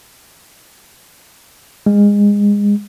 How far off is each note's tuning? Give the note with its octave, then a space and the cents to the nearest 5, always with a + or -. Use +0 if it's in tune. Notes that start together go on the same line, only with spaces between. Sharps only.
G#3 -25